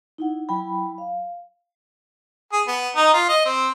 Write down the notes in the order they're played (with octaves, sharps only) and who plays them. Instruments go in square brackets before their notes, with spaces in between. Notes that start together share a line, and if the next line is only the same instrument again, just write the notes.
[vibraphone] D#4 E4 F#5
F#3 E4 G5 B5
F5
[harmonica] G#4
B3
D#4
F4
D#5
C4